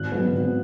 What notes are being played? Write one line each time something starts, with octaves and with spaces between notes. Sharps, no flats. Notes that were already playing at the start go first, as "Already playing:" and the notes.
Already playing: G#1 F#6
G#2 F#3 B3 D#4
G#1